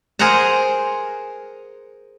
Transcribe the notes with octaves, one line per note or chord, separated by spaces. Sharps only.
G#4 A#4 C5 F#5 A#5